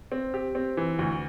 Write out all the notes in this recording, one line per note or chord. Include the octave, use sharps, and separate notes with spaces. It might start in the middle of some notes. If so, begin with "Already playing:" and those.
C4
G4
C4
E3
D2